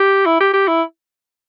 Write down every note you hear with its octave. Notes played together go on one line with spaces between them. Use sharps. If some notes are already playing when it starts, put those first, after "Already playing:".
Already playing: G4
E4
G4
G4
E4